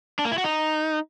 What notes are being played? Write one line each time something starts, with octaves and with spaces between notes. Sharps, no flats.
D4
A#3
E4
F#4
D#4